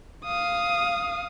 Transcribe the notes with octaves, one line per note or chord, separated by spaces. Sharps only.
F5 D#6